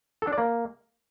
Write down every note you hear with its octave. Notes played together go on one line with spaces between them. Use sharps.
A4
D4
D5
A#3